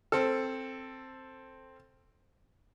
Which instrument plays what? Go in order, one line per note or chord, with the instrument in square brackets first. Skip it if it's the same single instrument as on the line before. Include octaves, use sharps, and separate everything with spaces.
[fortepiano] C4 A4